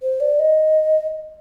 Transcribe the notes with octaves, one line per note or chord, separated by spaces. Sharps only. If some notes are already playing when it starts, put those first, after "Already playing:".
C5
D5
D#5